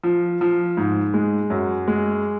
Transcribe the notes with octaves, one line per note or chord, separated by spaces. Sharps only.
F3
F3
G#2
G#3
F#2
G#3